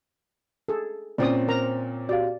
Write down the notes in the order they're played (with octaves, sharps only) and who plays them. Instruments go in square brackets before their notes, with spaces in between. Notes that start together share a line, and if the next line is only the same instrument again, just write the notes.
[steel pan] G#4 A4
[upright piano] A#2 C4 C#4 [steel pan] D5 D#6
[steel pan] A#4 A#5 [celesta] C5
[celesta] F#4 G4 F5 [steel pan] D5